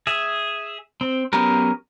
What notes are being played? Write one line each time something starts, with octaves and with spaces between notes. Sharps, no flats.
G#4 E5
C4
F#3 B3 C#4 G4 A#4